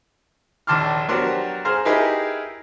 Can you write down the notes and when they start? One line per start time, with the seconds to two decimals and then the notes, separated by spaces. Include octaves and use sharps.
0.67 A#1 D#2 A5 C6 D6 F6
1.09 F#3 B3 D4 G4 A#4 C5
1.65 G#4 C5 F5 A#5
1.85 D#4 E4 G4 G#4 A#4 B4